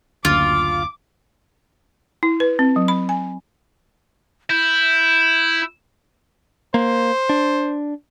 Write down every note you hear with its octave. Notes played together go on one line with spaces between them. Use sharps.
F#1 D2 F4 D6
E4
B4
C4
F#3
B5
G#5
E4 G6
A#3 C5
D4